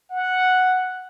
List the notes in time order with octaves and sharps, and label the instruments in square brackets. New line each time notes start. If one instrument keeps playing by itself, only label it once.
[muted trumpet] F#5